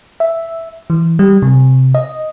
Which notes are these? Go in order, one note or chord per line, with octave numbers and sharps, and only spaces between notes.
E5
E3
G3
C3
D#5